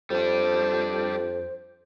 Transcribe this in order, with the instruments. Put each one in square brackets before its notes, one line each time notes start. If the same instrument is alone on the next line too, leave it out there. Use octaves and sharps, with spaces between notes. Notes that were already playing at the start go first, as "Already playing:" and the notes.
[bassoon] F2 [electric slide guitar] G3 D4 [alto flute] C5